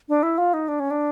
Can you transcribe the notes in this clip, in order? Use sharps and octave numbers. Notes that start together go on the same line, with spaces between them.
D4
E4
F4
D#4
D4
C#4
D4